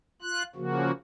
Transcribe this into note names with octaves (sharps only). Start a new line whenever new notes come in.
F4 F#6
C#3 F3 A#3 F#4